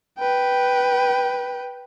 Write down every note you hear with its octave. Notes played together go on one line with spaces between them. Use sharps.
B4 G5